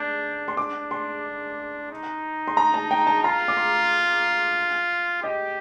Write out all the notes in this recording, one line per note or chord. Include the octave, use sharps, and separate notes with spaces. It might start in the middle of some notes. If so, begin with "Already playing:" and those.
Already playing: D4 G6
C6
D4 D6
C6
D#4
C6
A#5
A5
G5
A5
F4 A#5
D6
C6
G4 D#5